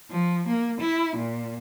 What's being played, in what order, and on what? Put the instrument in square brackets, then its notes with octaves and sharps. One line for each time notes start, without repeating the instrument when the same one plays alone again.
[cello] F3
A#3
E4
A#2